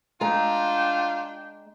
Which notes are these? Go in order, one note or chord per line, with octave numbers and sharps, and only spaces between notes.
G#3 D4 F4 G5 A#5